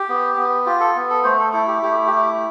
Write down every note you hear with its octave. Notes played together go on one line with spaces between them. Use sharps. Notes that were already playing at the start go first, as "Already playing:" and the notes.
Already playing: G4
B3
B3
F4 G4
A4
B3
A4
A3 C5
A4
E4 A4
G4
A3 G4
E4 G4